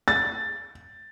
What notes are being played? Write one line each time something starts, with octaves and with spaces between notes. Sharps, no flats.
A6